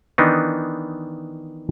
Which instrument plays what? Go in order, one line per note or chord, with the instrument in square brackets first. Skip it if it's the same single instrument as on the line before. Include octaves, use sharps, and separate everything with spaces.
[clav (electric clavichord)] D#3 E3 B3 D4 D#4